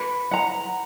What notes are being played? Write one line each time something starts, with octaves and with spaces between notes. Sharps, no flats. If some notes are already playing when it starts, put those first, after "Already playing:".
Already playing: B4 B5
F#5 A#5